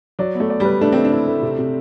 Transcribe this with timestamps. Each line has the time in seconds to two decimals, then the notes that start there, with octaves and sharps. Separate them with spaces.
0.19 F#3 D5
0.35 A3 B3
0.50 D5
0.60 G3 B4
0.81 A3 D4
0.92 A3 C4
1.05 D4
1.12 E4
1.27 A3
1.42 C3
1.58 C3